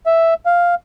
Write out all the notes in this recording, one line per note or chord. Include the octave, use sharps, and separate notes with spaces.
E5
F5